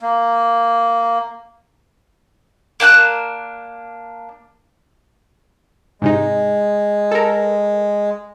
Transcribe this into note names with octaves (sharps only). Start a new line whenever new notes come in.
A#3
A#3 D4 G5 F#6
G#2 C3 G#3 D#4
A4 A#4